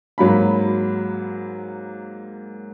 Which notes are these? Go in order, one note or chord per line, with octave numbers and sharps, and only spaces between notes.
G#2 F#3 A#3 B5